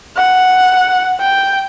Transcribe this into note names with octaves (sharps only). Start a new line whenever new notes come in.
F#5
G5